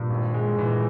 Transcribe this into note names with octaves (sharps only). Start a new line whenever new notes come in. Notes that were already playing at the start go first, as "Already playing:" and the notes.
Already playing: G2 A#2
G#1
G#3
A#2 E3